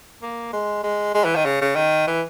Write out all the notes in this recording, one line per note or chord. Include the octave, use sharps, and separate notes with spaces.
A#3
G#3
G#3
G#3
E3
D#3
C#3
C#3
D#3
E3